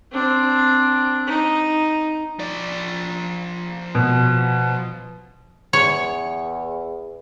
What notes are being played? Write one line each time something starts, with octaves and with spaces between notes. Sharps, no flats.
C4 D4
D#4
F3 D5
B2
E2 C#5